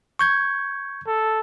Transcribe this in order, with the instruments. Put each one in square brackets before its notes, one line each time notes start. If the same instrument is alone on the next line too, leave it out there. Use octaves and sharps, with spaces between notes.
[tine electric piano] C#6 G6 G#6
[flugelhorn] A4